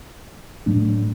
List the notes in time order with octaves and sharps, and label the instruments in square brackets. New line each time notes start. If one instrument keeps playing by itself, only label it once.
[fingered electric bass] A2 F#3 A3 D4